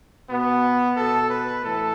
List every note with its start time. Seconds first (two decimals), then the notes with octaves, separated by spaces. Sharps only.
0.29 B2 B3
0.96 B2 A4
1.29 B4
1.63 A2 E3 A4